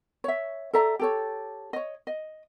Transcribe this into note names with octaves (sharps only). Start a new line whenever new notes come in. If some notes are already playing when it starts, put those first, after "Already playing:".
C#5 E5
A4 D5 E5 A#5
G4 A4 C#5
C#5 D#5
D#5